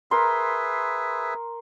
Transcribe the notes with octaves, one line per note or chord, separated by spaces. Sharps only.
G#4 A#4 B4 E5 C6